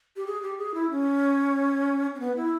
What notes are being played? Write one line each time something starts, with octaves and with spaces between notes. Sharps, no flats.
G4
G#4
G4
G#4
E4
C#4
C#4
B3
E4